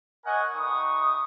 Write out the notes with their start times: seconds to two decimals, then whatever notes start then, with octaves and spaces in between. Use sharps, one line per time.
0.25 A#4 C#5 D#5 F#5 G#5
0.54 G3 A3 D#4 B4 C#6 D#6